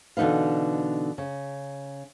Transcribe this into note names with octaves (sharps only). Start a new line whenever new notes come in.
B2 D3 E3 D#4 B4 F5
C#3